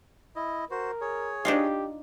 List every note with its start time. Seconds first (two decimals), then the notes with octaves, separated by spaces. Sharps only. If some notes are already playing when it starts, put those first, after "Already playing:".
0.36 E4 D#5
0.71 F#4 A#4 C5
1.01 G#4 C#5
1.45 D4 D#4 F4 G4